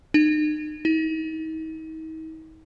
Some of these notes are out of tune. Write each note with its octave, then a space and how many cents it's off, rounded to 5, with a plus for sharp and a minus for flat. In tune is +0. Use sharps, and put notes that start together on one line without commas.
D#4 -40
D#4 +40